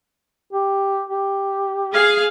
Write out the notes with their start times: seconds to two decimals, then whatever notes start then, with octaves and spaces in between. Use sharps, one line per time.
0.53 G4
1.09 G4
1.93 G#4 F5